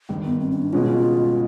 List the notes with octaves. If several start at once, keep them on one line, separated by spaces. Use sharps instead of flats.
G#1 G2 D#3
B3
C4
C#4
D4
C#2 B2 G#3 C#4 F4